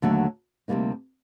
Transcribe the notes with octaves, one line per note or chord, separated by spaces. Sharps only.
D#2 D3 F#3 A3
D2 C3 G3 A#3 D#4